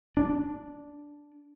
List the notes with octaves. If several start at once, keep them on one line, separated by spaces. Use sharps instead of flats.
D4